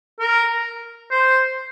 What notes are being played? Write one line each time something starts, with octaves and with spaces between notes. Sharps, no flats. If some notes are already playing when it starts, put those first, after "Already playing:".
A#4
C5